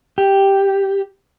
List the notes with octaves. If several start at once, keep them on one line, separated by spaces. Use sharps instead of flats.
G4